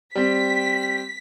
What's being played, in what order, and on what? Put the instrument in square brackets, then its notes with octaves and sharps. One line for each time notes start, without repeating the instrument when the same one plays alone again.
[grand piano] G3 C4 [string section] B6